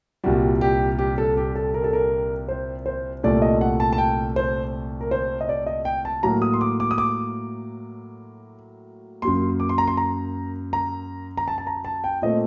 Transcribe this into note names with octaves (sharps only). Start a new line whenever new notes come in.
C2 A#2 G3 F#4
G4
G4
A4
G4
A4
A#4
A4
A#4
C5
C5
C2 A#2 A3 D5
D#5
F#5
A5
A5
G5
C5
A#4
C5
D#5
D5
D#5
G5
A5
A2 F#3 A#3 A#5
D#6
C6
D6
D6
D#6
D6
F#2 F#3 A#3 C6
D6
C6
A#5
C6
A#5
A#5
A#5
A5
A5
A#5
A5
G5
A#2 A3 C4 D#5